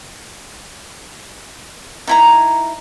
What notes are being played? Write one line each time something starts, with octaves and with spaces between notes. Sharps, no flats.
D#4 E4 A#5